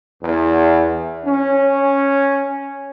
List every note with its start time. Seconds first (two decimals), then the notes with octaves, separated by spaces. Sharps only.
0.23 E2
1.25 C#4